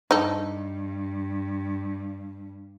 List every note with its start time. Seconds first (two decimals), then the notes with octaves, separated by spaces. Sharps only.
0.11 G2 D#4 A4